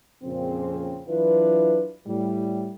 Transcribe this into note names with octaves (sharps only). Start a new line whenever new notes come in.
F2 A#2 C#3 C4
E3 F#3 D4 E4 F4 B4
A2 G3